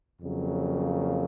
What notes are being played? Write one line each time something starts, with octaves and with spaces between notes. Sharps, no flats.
F2 C#3 F#3 A#3